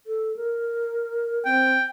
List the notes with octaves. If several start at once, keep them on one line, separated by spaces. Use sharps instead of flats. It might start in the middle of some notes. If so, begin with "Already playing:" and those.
A4
A#4
C4 G5